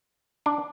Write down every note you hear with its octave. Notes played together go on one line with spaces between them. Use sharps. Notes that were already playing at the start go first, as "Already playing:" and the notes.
D4 D5